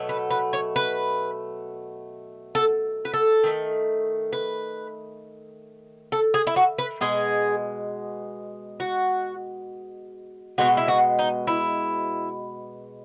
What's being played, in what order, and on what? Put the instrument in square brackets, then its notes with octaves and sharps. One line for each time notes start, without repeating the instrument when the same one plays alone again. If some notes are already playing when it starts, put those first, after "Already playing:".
Already playing: [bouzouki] B2 F#3 A3
B4
B4
C#5
B4
A4
B4
A4
D#3 A3
B4
A4
G#4
E4
F#4
B4
B2 G#3 G#4
F#4
B2 G#3 F#4
E4
F#4
D#4
E4